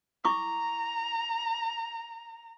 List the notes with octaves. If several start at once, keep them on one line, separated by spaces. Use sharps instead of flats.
E4 A#5 C#6 D6